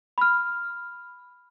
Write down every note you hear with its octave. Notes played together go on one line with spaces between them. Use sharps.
B5 F6